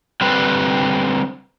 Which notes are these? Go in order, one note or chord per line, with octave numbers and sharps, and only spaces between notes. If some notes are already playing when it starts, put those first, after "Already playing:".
D3 G3 C4 B4 C5